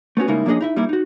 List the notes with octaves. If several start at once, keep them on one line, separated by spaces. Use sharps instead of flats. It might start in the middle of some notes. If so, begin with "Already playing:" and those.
A3 B3 C#4 F#4
C#3 G3 G#3 A#3 D#4 E4
F3 A#3 C#4 D4 G#4 D#5
D#4 E4 E5
G3 A#3 D#4 E4
D#4 F#4